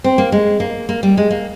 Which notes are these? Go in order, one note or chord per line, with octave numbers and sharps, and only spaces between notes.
C4
A#3
G#3
A#3
A#3
G3
G#3
A#3